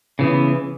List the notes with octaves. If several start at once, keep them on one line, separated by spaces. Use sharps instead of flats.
C#3 E3 B3